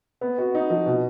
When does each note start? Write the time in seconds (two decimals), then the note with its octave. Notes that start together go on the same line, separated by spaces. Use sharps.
0.21 B3
0.38 F#4
0.55 D#4
0.70 F3
0.86 B2